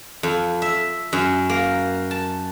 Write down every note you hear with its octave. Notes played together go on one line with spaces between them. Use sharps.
F2
E5
F#2
A#3
A5